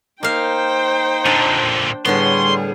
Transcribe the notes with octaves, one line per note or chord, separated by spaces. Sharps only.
A#3 D#4 C5 F5 G5
A#2 D3 D4
A2 D3 G3 B3 G#4 C#5 C6